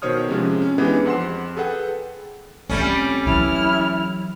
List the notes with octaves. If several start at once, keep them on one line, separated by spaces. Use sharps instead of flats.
B2 D#3 C5 C#5 D#6 F6
C3 F3 G#3 C#4 G#4
C#4
E3 G#3 B3 D4 G4 G#4
F2 F#5 C6 E7
G#4 A4 B4 F#5 G5
G3 A3 C4 C#4 F4
E3 F#3 E4 F6